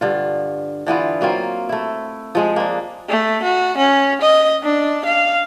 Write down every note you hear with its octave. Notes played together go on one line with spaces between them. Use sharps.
G2 D3 F4
D3 E3 B3 F4
F#3 A#3 C4 F4
A3 E4
F3 G#3 G#4
A#3 D4
A3
F#4
C#4
D#5
D4
F5